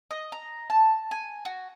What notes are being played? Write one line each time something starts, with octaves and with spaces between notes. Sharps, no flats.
D#5
A#5
A5
G#5
F#4